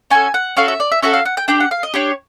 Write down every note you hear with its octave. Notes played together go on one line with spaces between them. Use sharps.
C#4 F#4 A4 G#5
F#5
C#4 F#4 A4 F5
E5
D5
E5
C#4 F#4 A4 E5
F5
F#5
G5
D4 G4 G5
F#5
F5
D#5
D4 G4 C#5